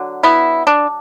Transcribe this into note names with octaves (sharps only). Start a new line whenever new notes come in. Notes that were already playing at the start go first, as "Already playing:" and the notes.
Already playing: D3 F#3
B3 E4
D4